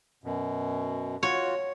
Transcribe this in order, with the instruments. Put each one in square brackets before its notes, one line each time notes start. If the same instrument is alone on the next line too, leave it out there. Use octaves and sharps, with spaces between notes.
[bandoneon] F#2 B2
[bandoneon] F4 F#4 [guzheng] C#5